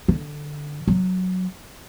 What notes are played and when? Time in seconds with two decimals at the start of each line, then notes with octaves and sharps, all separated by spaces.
0.08 D3
0.88 F#3